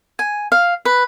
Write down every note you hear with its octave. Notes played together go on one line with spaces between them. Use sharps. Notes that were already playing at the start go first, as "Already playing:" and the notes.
G#5
F5
B4